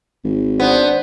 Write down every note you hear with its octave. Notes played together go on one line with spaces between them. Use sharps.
G#1
B3 D4 C5